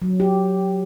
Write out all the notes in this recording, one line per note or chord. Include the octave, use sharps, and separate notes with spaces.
F#3
G4